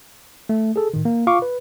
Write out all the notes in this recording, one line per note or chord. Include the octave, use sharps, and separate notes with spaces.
A3
G#4 A4
A2 D#3
A#3
F4 F5 C#6 D6
B4